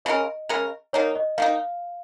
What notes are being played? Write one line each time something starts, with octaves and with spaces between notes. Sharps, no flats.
C#3 G#3 C#4 A#4 D#5
C#3 G#3 C#4 A#4
D#3 A#3 D#4 C#5
D#5
D#3 A#3 D#4 F5